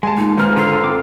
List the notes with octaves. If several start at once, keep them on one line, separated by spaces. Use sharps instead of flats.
G#3 G#5 A5
A#2 D#4
G#1 B4 A#5 F6
D3 F4 A4 F5
C4 D6